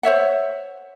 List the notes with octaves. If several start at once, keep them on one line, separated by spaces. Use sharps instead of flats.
C5 C#5 E5 F#5